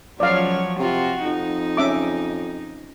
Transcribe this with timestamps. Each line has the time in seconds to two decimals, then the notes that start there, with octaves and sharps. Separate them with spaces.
0.20 C#2 F3 F#3 C#5 D5 F5
0.79 C3 F4 F#4
1.25 F2 D#4
1.77 C#4 E5 D6